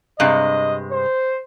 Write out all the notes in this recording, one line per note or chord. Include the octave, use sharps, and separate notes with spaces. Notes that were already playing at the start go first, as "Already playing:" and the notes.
G2 C3 G#3 D#5
C5